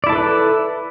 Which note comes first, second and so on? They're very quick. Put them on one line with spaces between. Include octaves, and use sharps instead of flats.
D5 E4 A5 A4 B4